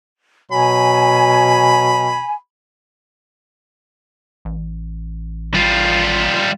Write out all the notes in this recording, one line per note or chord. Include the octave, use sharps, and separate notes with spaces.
B2 F#3 G#5 B5
A1
G3 F4